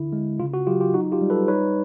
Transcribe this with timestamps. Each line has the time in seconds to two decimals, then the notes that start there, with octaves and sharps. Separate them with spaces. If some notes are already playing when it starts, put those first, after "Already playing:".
Already playing: D3 E4
0.13 G#3
0.40 C#3 F4
0.54 F#4
0.67 F#3 F4 G4
0.81 F4 G4
0.94 D#4 F#4
1.12 F4 G4
1.21 G3
1.30 A4 B4
1.48 D#4 B4 C#5